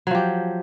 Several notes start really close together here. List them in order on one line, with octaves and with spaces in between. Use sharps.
F#3 F3 G4